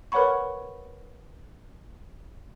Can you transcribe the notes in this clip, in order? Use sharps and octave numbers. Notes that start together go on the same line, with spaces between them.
A#4 B4 C#5 F#5 B5 C#6